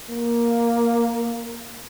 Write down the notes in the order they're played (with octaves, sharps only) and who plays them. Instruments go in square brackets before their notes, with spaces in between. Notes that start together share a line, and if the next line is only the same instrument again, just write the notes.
[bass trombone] A#3